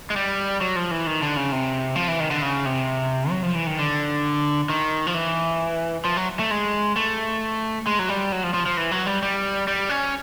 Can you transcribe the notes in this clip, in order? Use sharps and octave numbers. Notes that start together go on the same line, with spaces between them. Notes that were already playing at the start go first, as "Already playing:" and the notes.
G#3
G3
F#3
F3
E3
D#3
D3
C#3
C3
F3
E3
D#3
D3
C#3
C3
F#3
F3
E3
D#3
D3
D#3
F3
E3
F3
F#3
A3
G#3
A3
G#3
F#3
G3
F#3
F3
F3
F3
E3
F#3
G3
G3
G3
C#4